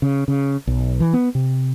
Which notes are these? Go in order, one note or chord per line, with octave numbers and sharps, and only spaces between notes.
C#3
C#3
B1
E3
B3
C3